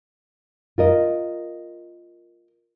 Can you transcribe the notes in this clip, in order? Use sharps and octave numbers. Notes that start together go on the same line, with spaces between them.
F4 A#4 D#5